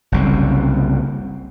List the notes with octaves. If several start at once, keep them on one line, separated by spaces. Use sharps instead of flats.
F#1 C2 F#2